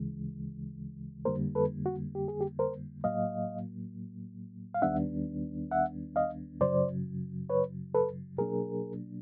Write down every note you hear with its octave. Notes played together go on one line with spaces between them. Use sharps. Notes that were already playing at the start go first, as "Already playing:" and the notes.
Already playing: D2 C#3 E3 G#3
F2 D3 G3 A#3 A#4 C5
A4 B4
F#4
G4
G#4
G4
A#4 C5
A2 F#3 A#3 D#5 F5
F5
D#2 D#3 G3 B3 D4 E5 F#5
E5 F#5
D#5 F5
F#2 C#3 F#3 C5 D5
B4 C#5
A4 B4
B2 F#3 A#3 D4 G#4 A#4